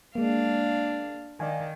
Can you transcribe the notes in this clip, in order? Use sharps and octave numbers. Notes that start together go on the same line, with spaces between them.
G#3 A#3 D4 F5
D#3 D5 F5 G#5